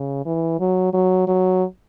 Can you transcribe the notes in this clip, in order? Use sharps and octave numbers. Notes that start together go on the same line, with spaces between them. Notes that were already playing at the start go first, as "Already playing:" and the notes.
Already playing: C#3
E3
F#3
F#3
F#3